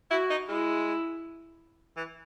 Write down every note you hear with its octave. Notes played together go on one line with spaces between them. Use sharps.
E4 F#4
D#4
G#3 E4
E3